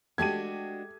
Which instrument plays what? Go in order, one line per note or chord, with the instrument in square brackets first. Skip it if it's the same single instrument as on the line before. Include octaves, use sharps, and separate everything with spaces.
[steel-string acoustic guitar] G#3 D4 F#4 [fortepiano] A3 G4 A5 [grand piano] G#6 D#7